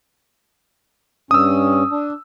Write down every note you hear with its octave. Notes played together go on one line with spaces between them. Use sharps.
G2 C#4 D#6 E6
D4